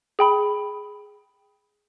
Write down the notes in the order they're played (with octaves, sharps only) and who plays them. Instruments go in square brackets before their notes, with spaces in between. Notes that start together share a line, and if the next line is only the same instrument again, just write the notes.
[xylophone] G#4 G5 B5